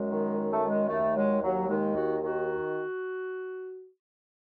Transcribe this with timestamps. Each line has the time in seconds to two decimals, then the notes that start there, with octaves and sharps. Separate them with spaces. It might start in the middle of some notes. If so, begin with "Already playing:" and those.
Already playing: F#2 G#3
0.11 D#3
0.37 F#2
0.52 A3
0.63 D#3 G#3
0.89 D#2 A3
1.16 F#3 G#3
1.42 D#2 F#3
1.69 D#3 G#3
1.95 D#2 F#4
2.22 D#3 F#4